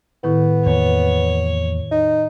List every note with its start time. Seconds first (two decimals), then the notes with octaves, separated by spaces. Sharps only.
0.24 A2 D#3 B3 E4
0.66 E2 A#3 C#5
1.91 D#4